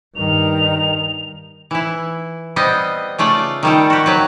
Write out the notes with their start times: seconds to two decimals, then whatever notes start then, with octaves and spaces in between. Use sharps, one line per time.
0.16 G2 D#3 F7
1.71 E3 E4
2.56 G3 B3 C4 D#5
3.18 C#3 A3 F4 D5
3.63 D#3 G3 A4
3.90 F#4 G4
4.06 F#3 B4